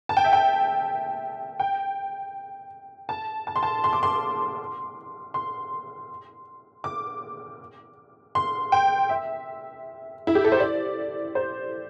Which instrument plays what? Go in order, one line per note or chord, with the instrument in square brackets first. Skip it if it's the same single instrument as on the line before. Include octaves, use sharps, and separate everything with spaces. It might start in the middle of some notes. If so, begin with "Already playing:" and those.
[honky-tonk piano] A5
G5
E5
G5
G5
A5
A5
C6
A5
C6
D6
C6
C6
D6
C6
G5
E5
E4
G4
A4
C5
D5
C5